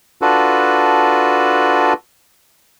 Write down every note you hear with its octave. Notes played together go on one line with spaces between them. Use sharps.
D4 F4 F#4 A4 B4